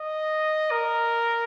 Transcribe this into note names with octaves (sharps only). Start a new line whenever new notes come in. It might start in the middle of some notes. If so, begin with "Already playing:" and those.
Already playing: D#5
A#4